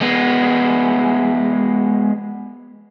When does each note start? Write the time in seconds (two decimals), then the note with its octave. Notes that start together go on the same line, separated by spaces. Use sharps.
0.01 G#3 B3